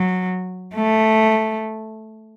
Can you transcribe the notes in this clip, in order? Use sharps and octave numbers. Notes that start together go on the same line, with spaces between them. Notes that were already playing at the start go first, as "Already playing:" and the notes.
Already playing: F#3
A3